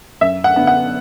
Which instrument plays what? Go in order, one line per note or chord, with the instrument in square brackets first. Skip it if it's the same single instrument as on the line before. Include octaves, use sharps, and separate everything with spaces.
[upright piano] F#2 E5
F#5
D3 B3
F#5